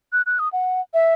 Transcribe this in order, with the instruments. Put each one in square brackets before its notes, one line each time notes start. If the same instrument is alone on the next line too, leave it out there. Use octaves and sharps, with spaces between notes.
[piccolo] F#6
F#6
D#6
F#5
E5